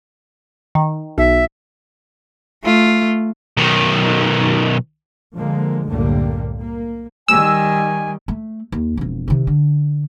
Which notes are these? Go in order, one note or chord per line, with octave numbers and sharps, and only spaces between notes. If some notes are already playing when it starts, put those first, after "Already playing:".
D#3
B1 E5
A3 F4
B1 D#3
D3 F3 G#3 A#3
C2 F#2 A2 D3 G3 A#3
A#3
D#3 G3 G#5 E6
A3
D#2
E1 F2
C3 D#3
D3